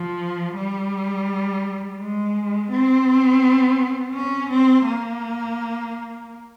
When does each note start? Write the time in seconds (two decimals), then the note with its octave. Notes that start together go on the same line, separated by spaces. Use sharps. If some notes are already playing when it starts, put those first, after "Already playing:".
Already playing: F3
0.55 G3
1.99 G#3
2.71 C4
4.14 C#4
4.50 C4
4.86 A#3